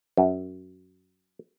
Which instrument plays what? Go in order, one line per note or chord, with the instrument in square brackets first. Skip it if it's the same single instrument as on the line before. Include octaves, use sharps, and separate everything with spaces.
[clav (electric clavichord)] F#2